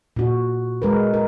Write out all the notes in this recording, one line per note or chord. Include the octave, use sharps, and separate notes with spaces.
A#2 F#4
G#3 A#4 B4
A#4